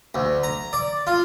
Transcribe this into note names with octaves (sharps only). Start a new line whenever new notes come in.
D2
A#5
D5
F4